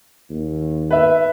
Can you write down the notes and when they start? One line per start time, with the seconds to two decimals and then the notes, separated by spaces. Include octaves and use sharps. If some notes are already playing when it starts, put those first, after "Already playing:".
0.30 D#2
0.91 B4 E5